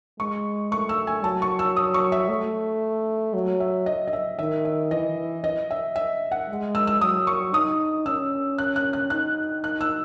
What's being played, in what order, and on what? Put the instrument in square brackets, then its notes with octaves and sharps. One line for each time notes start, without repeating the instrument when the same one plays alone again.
[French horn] G#3 [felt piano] C#6
[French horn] A3 [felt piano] C#6
[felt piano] E6
G#5
[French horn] F#3 [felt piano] A5
[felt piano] C#6
E6
D#6
C#6
E5
[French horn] A3
F#3
[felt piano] E5
D#5
D#5
E5
[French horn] D#3 [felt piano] E5
[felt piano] E5
[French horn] E3 [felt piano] D#5
[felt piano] D#5
E5
E5
F#5
[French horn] G#3
[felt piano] E6
E6
[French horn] F#3 [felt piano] D#6
[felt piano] C#6
[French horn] D#4 [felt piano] D#6
[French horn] C#4 [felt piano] E6
[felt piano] F#6
F#6
F#6
[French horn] D#4 [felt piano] F#6
[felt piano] F#6
E6